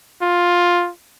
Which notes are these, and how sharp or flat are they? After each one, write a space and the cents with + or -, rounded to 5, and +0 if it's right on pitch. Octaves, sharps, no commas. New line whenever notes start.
F4 +10